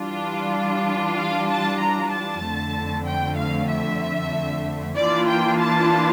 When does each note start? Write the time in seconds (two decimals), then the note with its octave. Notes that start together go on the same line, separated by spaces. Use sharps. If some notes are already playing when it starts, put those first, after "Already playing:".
Already playing: E3 G3 D4 F4
1.17 F5
1.48 A5
1.80 A#5
2.11 A5
2.43 F2 D3 A3
3.07 G5
3.38 F5
3.70 E5
4.97 E3 A#3 D4 F4 D5
5.29 G5
5.61 A5